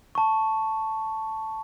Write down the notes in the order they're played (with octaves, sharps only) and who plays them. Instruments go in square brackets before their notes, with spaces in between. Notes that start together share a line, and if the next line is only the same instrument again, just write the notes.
[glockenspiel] A5 C#6